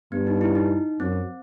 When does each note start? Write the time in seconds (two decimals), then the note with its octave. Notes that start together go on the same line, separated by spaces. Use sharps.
0.12 G2 B3
0.27 D#4
0.41 E4
0.55 D#4
1.00 F#2 C4